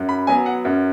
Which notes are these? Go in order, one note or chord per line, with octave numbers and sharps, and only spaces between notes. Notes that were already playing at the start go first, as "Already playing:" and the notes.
Already playing: F#2
B5
F#3 B3 G#5
F#5
F#2